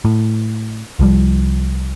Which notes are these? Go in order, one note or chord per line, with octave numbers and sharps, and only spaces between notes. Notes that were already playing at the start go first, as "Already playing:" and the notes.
A2
C2 F3 G3